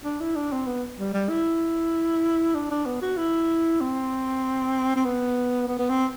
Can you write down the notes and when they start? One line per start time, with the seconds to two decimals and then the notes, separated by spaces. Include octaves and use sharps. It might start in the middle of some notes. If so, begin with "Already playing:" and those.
0.05 D4
0.21 E4
0.36 D4
0.52 C4
0.67 B3
0.99 G3
1.14 G3
1.29 E4
2.55 D4
2.71 D4
2.86 B3
3.02 F#4
3.17 E4
3.81 C4
4.96 C4
5.05 B3
5.68 B3
5.79 B3
5.90 C4